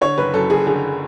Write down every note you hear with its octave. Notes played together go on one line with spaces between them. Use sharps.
D3 C#5
F#1 B4
F#2 A4
F#1 G#4
D3 G#4